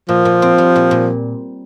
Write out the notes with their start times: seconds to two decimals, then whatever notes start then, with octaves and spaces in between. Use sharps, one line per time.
0.09 A#2 F3
0.25 A#2
0.42 C4
0.58 G3
0.76 A#2
0.91 A#2